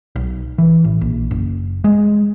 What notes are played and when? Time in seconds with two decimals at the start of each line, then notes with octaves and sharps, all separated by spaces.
0.16 B1
0.58 E3
0.84 A1
1.01 A#1
1.31 F#1
1.84 G#3